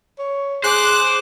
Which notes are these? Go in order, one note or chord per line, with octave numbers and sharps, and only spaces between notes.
C#5
G#4 C5 D6 F#6